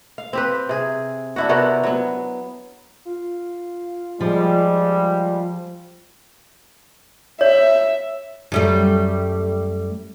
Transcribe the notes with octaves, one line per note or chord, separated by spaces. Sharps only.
F5
C4 G4 B4
C3 G#4
D4 E4 F#4
C3 B3 F#4 A#4
F#3 B3
F4
F3 G3 G#3
C#5 E5
F#2 G3 A3